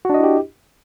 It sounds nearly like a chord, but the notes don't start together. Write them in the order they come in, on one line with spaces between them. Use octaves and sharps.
F#4 D4 D#5 E4 G4